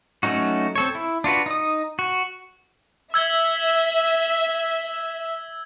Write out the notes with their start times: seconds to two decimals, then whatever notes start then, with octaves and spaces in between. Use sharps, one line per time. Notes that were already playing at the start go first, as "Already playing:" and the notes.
0.23 F#3 A3 C#4 D#4 F#4
0.76 C4 A4 C#5
0.95 E4
1.24 D4 F4 F#4 B4
1.46 D#4 D#6
1.99 F#4
3.14 E5 E6 G#6 G7